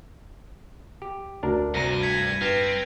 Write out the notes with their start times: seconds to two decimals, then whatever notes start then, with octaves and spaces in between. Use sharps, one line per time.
1.02 G4
1.43 D2 D4 A#4
1.75 C2 G2 A#5 A#6 D#7
2.03 G#6 B6 C#7
2.41 G2 C4 B4 F6 F7